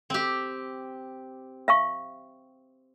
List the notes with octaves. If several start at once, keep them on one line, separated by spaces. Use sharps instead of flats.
C4 G4
E5 F5 C#6